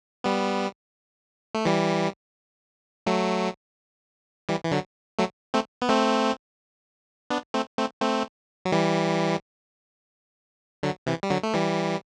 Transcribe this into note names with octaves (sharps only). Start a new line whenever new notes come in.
G3 B3
A3
E3 G3
F#3 A3
E3 G3
E3
D3 F#3
F#3 A3
A3 C4
B3
A3 C4
B3 D4
A3 C4
A3 C4
A3 C4
F#3
E3 G3
D3 F#3
C3 E3
G3
D3 F#3
A3
E3 G3